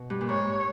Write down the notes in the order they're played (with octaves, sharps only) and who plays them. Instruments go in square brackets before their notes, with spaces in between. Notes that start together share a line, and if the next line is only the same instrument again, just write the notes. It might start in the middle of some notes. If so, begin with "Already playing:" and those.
Already playing: [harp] B2
G2
A#2
[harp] G#2 [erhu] C#5